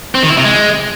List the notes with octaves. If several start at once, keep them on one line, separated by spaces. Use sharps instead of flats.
C4
D#3
E4
C3
G#3